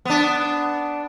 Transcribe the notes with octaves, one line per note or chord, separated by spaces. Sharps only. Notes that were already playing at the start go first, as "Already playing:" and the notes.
B3 D4